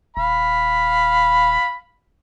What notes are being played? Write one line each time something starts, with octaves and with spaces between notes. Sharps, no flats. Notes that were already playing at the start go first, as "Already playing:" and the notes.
D#1 F5 B5